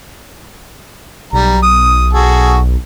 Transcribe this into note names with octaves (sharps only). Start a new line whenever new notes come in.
B1 G3 A#5
D#6
F#4 G#4 A4